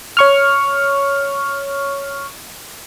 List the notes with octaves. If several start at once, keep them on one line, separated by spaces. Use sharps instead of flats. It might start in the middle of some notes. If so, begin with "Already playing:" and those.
C#5 C#6 F6